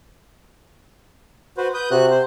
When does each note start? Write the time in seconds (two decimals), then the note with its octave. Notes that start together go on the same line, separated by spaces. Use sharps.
1.58 F#4 B4 C5
1.74 B4 D#6 G6
1.91 C3 F#4 F#6
2.10 C5